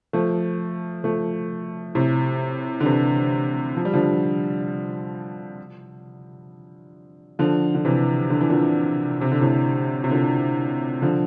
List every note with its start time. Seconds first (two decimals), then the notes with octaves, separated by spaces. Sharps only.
0.13 F3 A3
1.04 F3 A3
1.95 A2 C3
2.80 D3
2.85 C3 E3
3.77 F3
3.85 G3
3.94 D3 F3
7.39 D3 F3
7.75 D3
7.85 C3 E3
8.30 D3
8.41 E3
8.50 A#2 D3
9.21 C3
9.32 D3
9.41 A2 C3
10.04 C3
10.11 A#2 D3
11.02 D3 F3